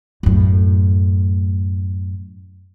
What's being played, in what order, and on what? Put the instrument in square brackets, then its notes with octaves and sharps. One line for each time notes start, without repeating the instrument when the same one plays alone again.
[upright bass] F#2 A2